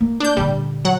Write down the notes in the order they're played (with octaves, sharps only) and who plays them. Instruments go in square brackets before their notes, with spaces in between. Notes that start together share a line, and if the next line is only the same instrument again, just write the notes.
[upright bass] A#3
[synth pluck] D4 G6
[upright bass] A#2 D3 [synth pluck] G3
[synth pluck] F#3 F#5